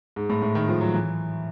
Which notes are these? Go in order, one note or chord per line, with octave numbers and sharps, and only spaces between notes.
G#2
A2
A2
D#3
F3
F#3
E3